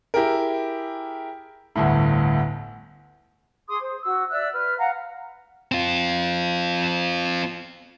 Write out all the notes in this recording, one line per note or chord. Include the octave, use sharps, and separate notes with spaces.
E4 G4 G#4 A#4
G1 D2 A2
G#4 C6 D6 D#6
C5
F#4 E6
D5 E5 E6 F#6
B4 F6
F5 F#5 A#5
C4 F4